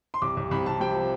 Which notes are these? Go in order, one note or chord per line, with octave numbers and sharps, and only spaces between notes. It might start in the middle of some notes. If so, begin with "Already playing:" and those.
C6
C2 D6
C2
C2 B5
C2 A5
C3 G5
F3